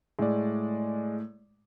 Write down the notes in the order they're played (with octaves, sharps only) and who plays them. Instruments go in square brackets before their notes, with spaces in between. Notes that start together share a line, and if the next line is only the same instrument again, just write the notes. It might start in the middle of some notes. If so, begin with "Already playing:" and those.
[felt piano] A2 [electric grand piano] G#3 D5